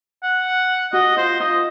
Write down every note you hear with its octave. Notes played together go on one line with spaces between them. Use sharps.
F#5
F#4 D#5
F4 C5
F4 D#5